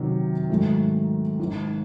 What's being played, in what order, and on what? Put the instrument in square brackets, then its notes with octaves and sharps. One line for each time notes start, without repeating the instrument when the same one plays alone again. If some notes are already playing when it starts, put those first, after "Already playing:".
Already playing: [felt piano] C3 D#3 F#3
G#1 G#2 F#3 A3
G#1 G#2 D#3